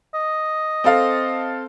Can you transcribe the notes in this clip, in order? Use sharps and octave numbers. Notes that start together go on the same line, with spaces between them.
D#5
C4 A4 F5